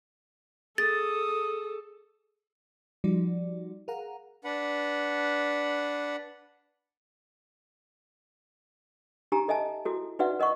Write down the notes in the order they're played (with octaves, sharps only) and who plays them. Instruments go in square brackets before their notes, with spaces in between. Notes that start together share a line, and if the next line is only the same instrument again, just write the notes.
[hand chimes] G#4 [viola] A4 [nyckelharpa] D#6 [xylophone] A6
[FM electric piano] F3 G3 D#4 F#4 D5
G#4 A#4 F5 F#5 A#5
[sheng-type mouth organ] D4 B4 F#5
[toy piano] D#4 G4 G#5 A#5
A4 D#5 E5 G#5 A5
E4 F#4 A4
D#4 F#4 B4 D5 E5 F#5
A#4 D#5 F#5 C#6